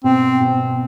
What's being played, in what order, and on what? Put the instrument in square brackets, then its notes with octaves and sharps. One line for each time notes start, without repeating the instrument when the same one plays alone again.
[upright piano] B2 [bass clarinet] C4
[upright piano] B2